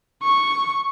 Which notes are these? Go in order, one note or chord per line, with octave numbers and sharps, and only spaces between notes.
C#6